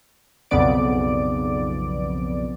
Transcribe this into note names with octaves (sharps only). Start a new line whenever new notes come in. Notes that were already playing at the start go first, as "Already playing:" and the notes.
B1 F2 C#3 B3 D5 D7